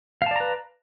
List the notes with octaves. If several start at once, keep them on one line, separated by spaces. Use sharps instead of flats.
B4 D5 F5 A5 A#5